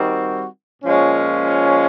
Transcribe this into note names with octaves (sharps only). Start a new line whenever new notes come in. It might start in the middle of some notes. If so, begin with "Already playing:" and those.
Already playing: D#3 G3 C4 F#4
A#2 F3 G#3 C#4